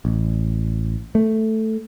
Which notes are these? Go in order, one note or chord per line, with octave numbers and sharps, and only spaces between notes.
A1
A3